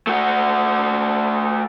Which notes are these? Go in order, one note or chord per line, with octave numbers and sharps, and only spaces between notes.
A3 F#4